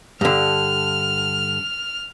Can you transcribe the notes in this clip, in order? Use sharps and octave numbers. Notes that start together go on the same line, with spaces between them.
G2 D3 F6